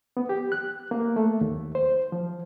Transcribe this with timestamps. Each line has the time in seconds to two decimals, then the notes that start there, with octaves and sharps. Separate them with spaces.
0.17 B3
0.29 G4
0.52 F#6
0.91 A#3
1.16 A3
1.41 D#2
1.75 C5
2.12 F3